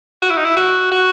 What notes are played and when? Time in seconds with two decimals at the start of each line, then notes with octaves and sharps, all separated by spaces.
0.22 F#4
0.30 E4
0.37 D#4
0.45 E4
0.56 F#4
0.91 F#4